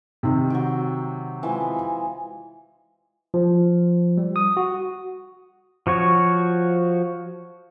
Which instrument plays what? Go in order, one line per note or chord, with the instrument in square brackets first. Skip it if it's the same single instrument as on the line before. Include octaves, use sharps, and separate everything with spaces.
[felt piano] C3 D#3
[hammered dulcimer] F#3 G5
E3 F3 G#3
[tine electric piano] F3
G3
D#6
F#4
[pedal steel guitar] F3 F#4 C#5